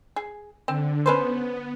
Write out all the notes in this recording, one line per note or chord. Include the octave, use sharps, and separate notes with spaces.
G#4
D3 C4
B3 C#4 B4 C5